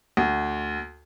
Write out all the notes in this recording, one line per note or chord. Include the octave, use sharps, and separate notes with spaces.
D2